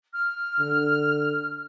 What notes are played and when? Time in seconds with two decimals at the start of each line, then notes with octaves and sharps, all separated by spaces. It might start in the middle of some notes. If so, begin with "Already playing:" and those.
0.13 F6
0.59 D3